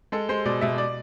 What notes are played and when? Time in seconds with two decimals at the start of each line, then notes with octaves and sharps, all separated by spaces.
0.12 G#3 A4
0.29 G#3 C5
0.45 B2 D5
0.61 B2 E5
0.78 D5